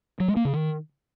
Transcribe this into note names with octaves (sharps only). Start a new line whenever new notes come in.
F#3
G#3
A#3
C#3
D#3